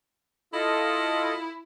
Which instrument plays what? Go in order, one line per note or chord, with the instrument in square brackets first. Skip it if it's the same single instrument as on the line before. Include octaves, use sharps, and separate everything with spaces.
[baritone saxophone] E4 [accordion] F4 A4 D#5